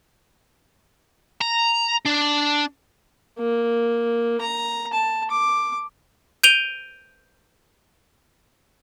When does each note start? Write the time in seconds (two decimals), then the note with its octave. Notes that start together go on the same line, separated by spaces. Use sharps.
1.41 A#5
2.05 D4
3.39 A#3
4.41 A#5
4.93 A5
5.30 D6
6.44 G6 D7 D#7 F7 G7